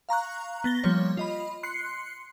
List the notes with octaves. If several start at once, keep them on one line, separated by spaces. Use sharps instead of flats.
F5 A#5 C#6 F#6
B3 A6 A#6 G7
F3 G3 A#3 C#5
F4 D#5 B5
C6 F#6 C7 C#7